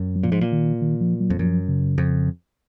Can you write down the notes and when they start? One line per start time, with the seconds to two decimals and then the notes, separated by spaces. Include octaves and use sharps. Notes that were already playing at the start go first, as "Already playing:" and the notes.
Already playing: F#2
0.16 F#3
0.23 A#2 F3
0.32 G#2
0.41 A#2
0.52 D#3
0.82 D#3
1.01 F3
1.20 F#3
1.30 F2
1.39 F#2 F3
1.68 C#3
1.98 F2